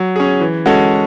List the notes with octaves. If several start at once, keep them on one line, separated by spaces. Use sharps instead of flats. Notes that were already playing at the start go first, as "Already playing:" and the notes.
Already playing: F#3
C#4 G#4
E3
G#3 C#4 F#4 A4